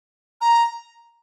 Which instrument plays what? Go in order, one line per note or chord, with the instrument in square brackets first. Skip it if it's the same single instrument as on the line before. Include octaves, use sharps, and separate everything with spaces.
[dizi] A#5